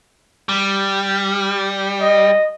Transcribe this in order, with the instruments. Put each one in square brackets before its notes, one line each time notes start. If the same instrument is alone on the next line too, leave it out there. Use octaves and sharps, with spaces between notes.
[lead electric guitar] G3
[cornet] D#5